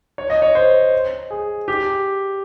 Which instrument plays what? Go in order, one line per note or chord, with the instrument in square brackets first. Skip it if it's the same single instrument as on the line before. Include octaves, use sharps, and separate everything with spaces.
[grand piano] C#5
D#5
C#5
C5
G#4
G4